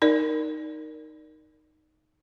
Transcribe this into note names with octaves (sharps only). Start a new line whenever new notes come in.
D#4 A#4 D5